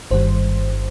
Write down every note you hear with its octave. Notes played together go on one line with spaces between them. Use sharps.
G1 G2 D#3 G3 C5